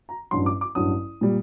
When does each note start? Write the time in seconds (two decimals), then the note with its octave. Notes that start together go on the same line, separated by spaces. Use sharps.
0.09 A#5
0.31 A1 G2 F#3 C6
0.46 D6
0.61 D6
0.75 A1 G2 F#3 D#6
1.21 A#2 G3